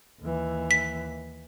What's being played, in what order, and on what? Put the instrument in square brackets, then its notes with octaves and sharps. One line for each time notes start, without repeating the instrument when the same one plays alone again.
[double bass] D#2 E3
[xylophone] B6